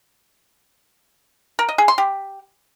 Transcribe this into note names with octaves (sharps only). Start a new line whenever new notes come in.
A#4
D#5
G#4
C6
G4